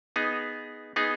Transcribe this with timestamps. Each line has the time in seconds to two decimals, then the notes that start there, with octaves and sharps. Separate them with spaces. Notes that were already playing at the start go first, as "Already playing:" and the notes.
0.16 B3 D#4 G#4
0.96 B3 D#4 G#4